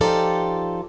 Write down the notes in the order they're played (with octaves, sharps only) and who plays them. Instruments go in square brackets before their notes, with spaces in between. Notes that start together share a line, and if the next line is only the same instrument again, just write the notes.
[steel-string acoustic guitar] F3 D#4 F4 G4 A4 D5